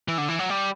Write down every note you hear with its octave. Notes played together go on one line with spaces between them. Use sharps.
E3
D3
E3
F#3
G3